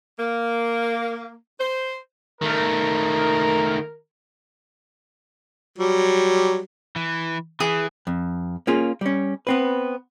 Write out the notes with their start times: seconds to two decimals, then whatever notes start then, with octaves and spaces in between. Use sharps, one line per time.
0.20 A#3
1.60 C5
2.41 D#3 A3 A#4
5.78 F#3 G3
6.96 E3
7.60 E3 G#4
8.07 F2
8.67 A#3 C#4 F4 G#4
9.01 G3 C#4
9.47 B3 C4 B4